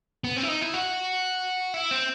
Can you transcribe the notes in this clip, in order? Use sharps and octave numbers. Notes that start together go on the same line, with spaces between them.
B3
C4
E4
D#4
E4
F#4
E4
C4